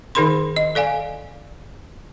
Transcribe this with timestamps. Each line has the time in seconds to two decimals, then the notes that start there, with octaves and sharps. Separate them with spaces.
0.15 D#3 D#4 G#4 A#4 B5 C6
0.56 D#5
0.75 A4 D5 F5 G#5